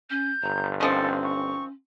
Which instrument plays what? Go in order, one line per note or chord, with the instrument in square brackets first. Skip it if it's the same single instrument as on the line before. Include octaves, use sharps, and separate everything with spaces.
[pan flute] C#4 [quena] G6
[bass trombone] G1 [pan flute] A#5
[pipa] D#3 F3 C4 [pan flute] C#4 [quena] A4
[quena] C#6